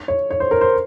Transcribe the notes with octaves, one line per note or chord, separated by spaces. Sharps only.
C#5
C#5
C5
A#4
C5